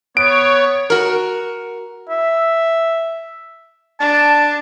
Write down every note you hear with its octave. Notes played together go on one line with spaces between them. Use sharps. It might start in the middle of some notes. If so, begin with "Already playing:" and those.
B3 C#5 D7
F#4 A#4
E5
D4 A5